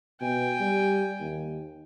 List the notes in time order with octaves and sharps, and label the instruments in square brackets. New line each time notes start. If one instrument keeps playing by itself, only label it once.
[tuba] B2 [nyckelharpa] G5 G#5
[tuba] G3
D#2